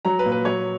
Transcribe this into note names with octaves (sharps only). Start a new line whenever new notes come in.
F#3 A#5
B4
A#2
B4
F#3 C#5